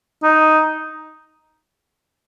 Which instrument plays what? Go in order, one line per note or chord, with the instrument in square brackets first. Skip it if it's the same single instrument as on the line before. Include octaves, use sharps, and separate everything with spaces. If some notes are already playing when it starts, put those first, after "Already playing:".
[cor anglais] D#4